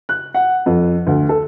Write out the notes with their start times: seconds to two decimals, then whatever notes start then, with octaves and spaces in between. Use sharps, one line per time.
0.09 F#6
0.34 F#5
0.66 F2
1.07 D2
1.29 A4